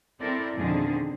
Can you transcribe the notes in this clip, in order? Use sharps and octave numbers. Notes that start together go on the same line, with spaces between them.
C4 E4 A4 A#4 D5
F2 B2 D3 D#3 G#4